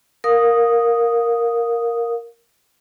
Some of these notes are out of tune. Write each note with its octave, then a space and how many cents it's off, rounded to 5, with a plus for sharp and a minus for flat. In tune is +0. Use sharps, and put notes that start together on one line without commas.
A#4 +0 F5 +20 D#6 +0